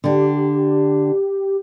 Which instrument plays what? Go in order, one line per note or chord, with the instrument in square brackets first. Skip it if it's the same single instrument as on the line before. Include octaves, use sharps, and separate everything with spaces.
[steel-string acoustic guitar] D3 D4 [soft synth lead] G4